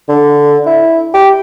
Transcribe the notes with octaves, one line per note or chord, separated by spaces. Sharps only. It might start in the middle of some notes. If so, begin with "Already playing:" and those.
D3
E4
G4